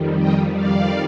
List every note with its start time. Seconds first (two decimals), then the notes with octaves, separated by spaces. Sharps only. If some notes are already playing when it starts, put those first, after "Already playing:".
Already playing: F2 D#3 G3
0.20 D#5 G5
0.56 D5 F5